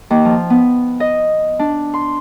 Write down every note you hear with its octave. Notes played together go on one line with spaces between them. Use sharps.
D#2
F3
B3
D#5
D4
C6